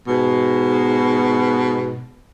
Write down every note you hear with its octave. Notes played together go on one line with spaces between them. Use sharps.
G#2 B2